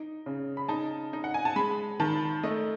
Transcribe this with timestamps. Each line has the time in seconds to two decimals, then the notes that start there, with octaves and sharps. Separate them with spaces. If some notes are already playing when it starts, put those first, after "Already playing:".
Already playing: D#4
0.26 C#3
0.57 B5
0.68 D#4 A5
1.13 D#4
1.24 F#5
1.34 G#5
1.45 A5
1.56 G#3 B5
2.00 D#3 A5
2.43 A3 D#5